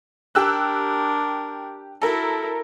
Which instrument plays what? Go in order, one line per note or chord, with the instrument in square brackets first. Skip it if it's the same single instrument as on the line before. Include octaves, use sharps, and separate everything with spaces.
[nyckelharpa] D4 A#4 [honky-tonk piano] G4 E6 F#6
[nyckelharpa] E4 F#4 [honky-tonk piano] A4 A#4